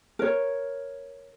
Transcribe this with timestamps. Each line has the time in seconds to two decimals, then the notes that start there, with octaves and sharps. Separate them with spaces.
0.19 A#4 C#5